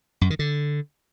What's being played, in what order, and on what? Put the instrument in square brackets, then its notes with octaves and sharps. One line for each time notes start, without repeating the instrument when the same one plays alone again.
[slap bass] F#2
D#3
D3